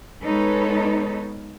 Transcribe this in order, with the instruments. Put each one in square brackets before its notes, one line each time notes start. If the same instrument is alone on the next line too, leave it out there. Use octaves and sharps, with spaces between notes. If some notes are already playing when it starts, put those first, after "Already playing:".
[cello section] G#3 B3 D#4 A4 B4 C#5